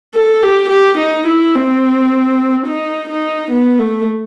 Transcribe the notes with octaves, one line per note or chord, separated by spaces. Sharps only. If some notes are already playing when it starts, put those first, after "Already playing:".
A4
G4
G4
D#4
E4
C4
D#4
D#4
B3
A3